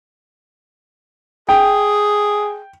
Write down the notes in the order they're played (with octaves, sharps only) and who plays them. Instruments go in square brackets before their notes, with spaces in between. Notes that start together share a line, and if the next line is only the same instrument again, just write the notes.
[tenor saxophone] G#4 [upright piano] G5